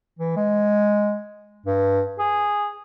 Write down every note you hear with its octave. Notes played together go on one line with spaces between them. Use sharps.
E3
G#3
G2
G#4